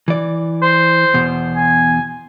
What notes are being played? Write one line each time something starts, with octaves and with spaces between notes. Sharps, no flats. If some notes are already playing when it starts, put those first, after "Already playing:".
E3 D5
C5
E2 B2
G#5